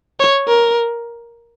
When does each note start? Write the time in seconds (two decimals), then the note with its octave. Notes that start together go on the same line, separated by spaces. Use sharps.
0.20 C#5
0.48 A#4